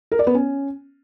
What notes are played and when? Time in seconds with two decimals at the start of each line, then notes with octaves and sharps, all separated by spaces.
0.12 A#4
0.19 D5
0.27 B3
0.34 C#4